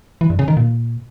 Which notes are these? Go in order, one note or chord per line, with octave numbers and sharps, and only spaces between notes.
E3
G2
C#3
D#3
A#2